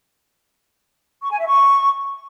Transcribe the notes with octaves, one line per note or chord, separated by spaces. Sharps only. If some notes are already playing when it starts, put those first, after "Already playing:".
C#6
G#5
E5
C#6